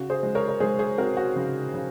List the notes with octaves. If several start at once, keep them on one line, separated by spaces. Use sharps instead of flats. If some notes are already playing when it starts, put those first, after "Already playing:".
Already playing: C#3 F#4
G#4 C5
G#3
A#4 C#5
A#4
G#3 G#4 C5
G#4 C5
C4 F#4 A#4
F#4
C#3
C#3